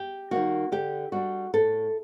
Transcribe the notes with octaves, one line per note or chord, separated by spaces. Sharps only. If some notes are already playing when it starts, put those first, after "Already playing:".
Already playing: G4
D#3 G3 A#3 F#4
D3 G4
G3 D4 F#4
A2 A4